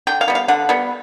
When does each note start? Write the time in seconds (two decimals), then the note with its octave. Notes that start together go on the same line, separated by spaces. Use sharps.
0.07 D3 G5
0.21 F5
0.28 G3 B3
0.35 F5
0.48 D3 F#5
0.69 G3 B3